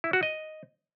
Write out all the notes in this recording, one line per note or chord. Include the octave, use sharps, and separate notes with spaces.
E4
F#4
D#5